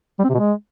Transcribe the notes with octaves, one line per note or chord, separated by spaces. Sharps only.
G3
C4
C3
B2
G#3